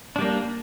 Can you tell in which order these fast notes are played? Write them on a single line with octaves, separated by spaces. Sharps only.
D4 G3 A#3